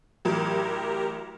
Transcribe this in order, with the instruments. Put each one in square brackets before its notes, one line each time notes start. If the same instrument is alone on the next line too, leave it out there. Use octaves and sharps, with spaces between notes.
[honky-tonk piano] A1 F#3 [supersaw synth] G4 A#4